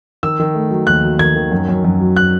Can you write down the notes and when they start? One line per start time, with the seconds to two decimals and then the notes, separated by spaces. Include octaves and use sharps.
0.23 D#3 E6
0.40 D#3
0.55 A3
0.71 F#3
0.87 D#2 F#6
1.03 F#3
1.19 D#3 G#6
1.36 D#3
1.52 F#2
1.68 F#2
1.85 F#2
2.01 F#3
2.16 F#6